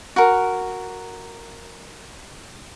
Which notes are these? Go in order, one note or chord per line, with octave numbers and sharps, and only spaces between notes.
F#4 A#4